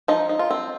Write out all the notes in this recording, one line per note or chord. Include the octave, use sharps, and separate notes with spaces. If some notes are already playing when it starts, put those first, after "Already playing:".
F3 D#4
D#4
F4
C4